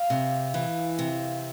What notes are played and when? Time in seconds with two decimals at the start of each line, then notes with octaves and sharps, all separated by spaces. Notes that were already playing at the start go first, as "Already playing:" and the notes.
Already playing: F5
0.10 C3
0.54 E3
0.99 C3